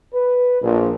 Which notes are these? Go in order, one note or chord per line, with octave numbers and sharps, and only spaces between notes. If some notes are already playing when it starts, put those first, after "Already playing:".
B4
A#1